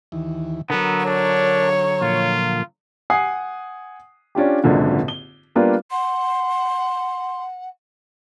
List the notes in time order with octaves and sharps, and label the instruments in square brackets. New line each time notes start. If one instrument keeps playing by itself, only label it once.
[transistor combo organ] D#2 E3
[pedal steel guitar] D3 F#3 [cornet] B3 [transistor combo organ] A#4
[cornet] D4 [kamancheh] C#5
[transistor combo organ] A#2 F3 [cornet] F4
[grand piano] F#5 G#5 D#6 C7
C#4 D4 F4 G4
G#1 C#2 F#2 A#2 D3
G7
G3 A#3 B3 D4 F4
[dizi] F#5 [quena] C6